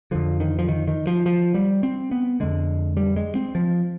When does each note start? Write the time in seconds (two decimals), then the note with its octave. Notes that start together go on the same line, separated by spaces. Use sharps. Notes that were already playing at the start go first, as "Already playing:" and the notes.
0.11 F2 D3 F3
0.40 D#3
0.59 F3
0.68 D#3
0.88 D#3
1.07 F3
1.26 F3
1.54 G3
1.83 C4
2.11 B3
2.40 F2 D3 G#3
2.97 G3
3.16 G#3
3.35 C4
3.55 F3